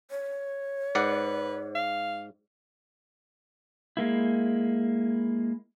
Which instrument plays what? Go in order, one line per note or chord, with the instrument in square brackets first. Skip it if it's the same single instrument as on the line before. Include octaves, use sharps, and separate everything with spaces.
[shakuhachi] C#5
[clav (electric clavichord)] G#2 D5 F#5 [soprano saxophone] B4
[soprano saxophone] F5
[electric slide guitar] G#3 A#3 E4